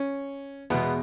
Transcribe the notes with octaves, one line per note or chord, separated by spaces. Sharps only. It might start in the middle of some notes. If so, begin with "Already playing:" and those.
Already playing: C#4
E2 B2 G#3 B3